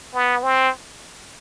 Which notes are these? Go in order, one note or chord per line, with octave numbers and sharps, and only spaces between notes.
B3
C4